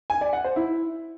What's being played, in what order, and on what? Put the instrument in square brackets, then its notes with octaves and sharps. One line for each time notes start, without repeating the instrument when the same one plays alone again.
[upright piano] G#5
D5
F#5
C5
E4